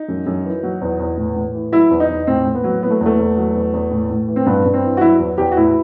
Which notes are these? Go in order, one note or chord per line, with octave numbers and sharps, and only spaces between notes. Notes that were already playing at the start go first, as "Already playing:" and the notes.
Already playing: D#4
F#2
F#2
E3
F#3
E2
E2
A2
A2
E3
F#3 E4
E2
D#4
E2
A2 C4
A2
B3
F#3
E3 B3
A3
E2
A3
E2
F#3
E2
E2
A2
A2
E3
C4
G2 B3
G2
C4
E3
F#4
F#3 E4
E2
E2 G4
F#4
A2 E4